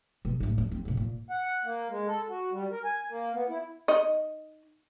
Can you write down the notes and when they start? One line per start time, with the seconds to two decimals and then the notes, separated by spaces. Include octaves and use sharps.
0.25 B2 B3
0.40 A1 D2
0.58 C#4
0.71 C4
0.85 B2 B3
0.97 A#2
1.31 F#5
1.65 A#3
1.89 G#3
2.07 A4
2.29 F#4
2.52 G3
2.71 A#4
2.84 G#5
3.09 A#3
3.34 B3
3.49 E4
3.88 D#4 D#5